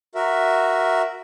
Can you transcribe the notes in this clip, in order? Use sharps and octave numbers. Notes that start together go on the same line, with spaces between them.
F#4 A#4 E5